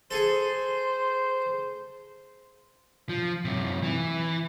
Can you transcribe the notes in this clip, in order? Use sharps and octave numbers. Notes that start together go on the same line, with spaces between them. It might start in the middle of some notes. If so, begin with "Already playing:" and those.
G#4 A4 C5
F3
F#2 C3
E3